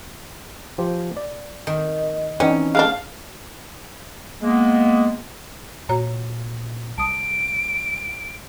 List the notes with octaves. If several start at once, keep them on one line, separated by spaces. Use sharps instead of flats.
F3 G4 C5
D5
D#3
D#3 E3 C#4 D#4 D5
G#3 A3 D4 F5
G#3 A#3 B3
A#2 F#4 C#5 A#5
C2 A5 D#6 D7